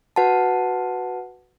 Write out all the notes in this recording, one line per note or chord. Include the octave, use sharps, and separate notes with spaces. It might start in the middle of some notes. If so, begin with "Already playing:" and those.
F#4 B4 F#5 A5